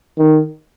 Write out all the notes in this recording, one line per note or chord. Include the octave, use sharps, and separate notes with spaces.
D#3